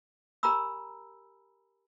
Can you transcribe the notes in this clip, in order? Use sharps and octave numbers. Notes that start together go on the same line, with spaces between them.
G4 A#4 G#5 A#5 B5 E6